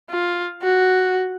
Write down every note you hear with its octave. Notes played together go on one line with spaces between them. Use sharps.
F4
F#4